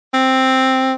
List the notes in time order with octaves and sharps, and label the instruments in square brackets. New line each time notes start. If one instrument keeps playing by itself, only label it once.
[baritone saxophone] C4